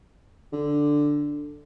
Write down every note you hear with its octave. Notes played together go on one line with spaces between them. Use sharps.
D3